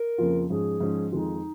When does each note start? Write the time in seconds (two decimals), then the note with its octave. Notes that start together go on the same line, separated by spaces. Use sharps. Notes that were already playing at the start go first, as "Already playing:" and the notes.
Already playing: A#4
0.18 F2 C#3 F3 A#3 F4
0.49 G#2 F3 C#4 G#4
0.80 G#2 F3 C#4
1.12 F2 D#3 G#3 D#4 F4